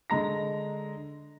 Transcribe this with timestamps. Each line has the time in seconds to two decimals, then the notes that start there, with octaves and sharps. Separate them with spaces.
0.10 D3 G#3 A#5 A#6